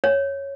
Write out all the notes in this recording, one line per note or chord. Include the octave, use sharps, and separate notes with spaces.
C#5